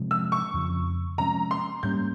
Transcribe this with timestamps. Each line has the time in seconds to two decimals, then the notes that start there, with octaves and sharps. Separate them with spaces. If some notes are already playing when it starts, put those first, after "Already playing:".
Already playing: C3 F3 G#3
0.11 E6
0.32 C#6
0.54 F2 C#3 F3
1.18 C3 F3 G#3 C#4 A#5
1.51 C6
1.83 G#2 G3 A#3 C#4 G6